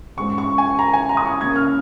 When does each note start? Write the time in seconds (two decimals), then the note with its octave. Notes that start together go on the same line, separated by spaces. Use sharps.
0.17 G#2 G#3 C#4 C#6
0.38 C#6
0.58 G#5
0.79 A#5
0.94 G#5
1.09 A#5
1.17 D#6
1.25 C#6
1.40 C#3 A#3 C#4 G#6
1.56 F6